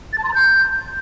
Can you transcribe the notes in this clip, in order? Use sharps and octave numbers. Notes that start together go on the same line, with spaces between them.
A6
A5
C6
A#5
G6